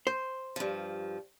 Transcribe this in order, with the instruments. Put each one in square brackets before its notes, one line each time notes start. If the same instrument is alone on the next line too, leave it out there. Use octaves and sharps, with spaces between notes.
[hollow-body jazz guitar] C5
[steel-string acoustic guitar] G2 F3